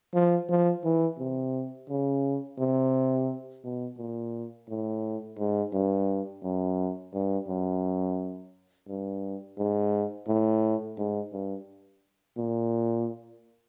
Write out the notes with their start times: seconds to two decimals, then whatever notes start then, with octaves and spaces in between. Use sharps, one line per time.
0.14 F3
0.49 F3
0.85 E3
1.19 C3
1.89 C#3
2.59 C3
3.64 B2
3.98 A#2
4.69 A2
5.39 G#2
5.73 G2
6.43 F#2
7.14 G2
7.48 F#2
8.88 G2
9.58 G#2
10.27 A2
10.98 G#2
11.33 G2
12.37 A#2